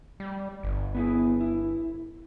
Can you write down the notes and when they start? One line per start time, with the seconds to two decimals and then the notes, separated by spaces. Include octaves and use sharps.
0.20 G3
0.63 G1
0.95 B3 E4 G#4
1.41 E4